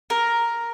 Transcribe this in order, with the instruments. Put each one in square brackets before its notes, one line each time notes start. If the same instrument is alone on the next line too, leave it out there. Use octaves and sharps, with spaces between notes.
[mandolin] A#4